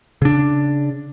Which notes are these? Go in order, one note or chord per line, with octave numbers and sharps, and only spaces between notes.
C#3 D4